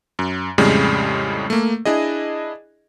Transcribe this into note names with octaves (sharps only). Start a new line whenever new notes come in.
F#2
F2 A2 C#3 G3 G#3
A3 A#3
D4 E4 G#4 D#5